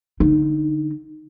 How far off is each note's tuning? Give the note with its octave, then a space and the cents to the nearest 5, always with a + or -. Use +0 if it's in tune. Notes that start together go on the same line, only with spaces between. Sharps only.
D3 +0 D#4 -10